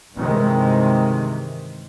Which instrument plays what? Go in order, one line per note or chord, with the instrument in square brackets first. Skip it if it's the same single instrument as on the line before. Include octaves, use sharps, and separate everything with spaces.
[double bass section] G2 C3 D#3 E3 G#3